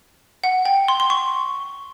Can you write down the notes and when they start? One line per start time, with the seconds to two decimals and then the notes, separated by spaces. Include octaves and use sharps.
0.44 F#5
0.65 G5
0.88 C6
1.00 C6
1.10 C#6